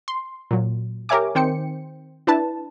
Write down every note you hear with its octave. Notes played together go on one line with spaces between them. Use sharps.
C6
A#2 F#3
G4 A#4 C#5 E5 G#5 D6
D#3 C4 C5 G5 C#7
D4 E4 B4 A5